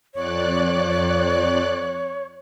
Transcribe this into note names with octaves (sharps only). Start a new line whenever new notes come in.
F2 C#5 D5 F#6